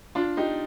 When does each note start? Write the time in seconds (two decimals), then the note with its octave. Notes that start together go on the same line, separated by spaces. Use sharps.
0.15 D4 F4
0.37 D#4 G4